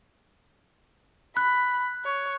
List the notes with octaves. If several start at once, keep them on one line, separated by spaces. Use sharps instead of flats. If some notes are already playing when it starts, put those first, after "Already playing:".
B5 F#6
C#5